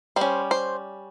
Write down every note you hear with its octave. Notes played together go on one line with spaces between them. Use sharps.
G3 C#4 C5
C5